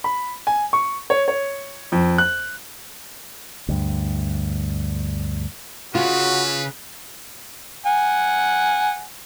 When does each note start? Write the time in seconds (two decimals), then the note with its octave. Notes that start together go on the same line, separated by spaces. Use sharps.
0.04 B5
0.47 G#5
0.73 C#6
1.10 C#5
1.28 C#5
1.92 F2
2.18 F#6
3.68 D2 G2
5.95 C#3 F4 F#4 B4
7.86 F#5 G#5